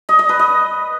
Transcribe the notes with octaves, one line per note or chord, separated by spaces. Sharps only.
D#5
D#5
B4
D#5